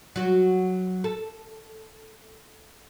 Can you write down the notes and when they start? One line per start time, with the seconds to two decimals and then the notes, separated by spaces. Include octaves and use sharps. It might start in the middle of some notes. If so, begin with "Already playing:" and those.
0.16 F#3 F#4
1.04 A4